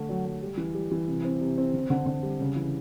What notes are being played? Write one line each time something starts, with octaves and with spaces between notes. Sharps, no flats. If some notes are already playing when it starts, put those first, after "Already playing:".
Already playing: D3 A3
F#3
F#3
G3
E3
G3
E3
C3
C4
C3
C4
D3
D3
D3
G3
C#3
E3